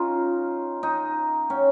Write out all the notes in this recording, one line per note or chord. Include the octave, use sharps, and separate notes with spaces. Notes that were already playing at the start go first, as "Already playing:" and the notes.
Already playing: C#4 D#4 F4
D#4
C#4